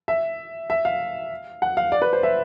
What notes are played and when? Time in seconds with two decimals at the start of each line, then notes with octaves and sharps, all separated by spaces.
0.08 E5
0.70 E5
0.85 F5
1.62 F#5
1.77 F5
1.92 D5
2.02 B4
2.13 C5
2.23 E5